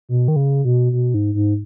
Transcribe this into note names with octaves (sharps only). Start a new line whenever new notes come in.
B2
D#3
C#3
B2
B2
G#2
G#2